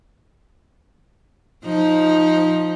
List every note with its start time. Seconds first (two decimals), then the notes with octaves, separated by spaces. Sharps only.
1.64 F3 D#4